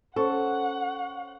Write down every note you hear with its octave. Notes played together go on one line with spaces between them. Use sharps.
C#4 A4 C5 F#5 C#6